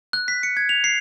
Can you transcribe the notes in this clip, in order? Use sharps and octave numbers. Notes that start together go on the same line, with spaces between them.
F#6
B6
C#7
G#6
F7
C7